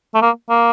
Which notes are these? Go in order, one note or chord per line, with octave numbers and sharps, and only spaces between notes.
A3
A#3
A#3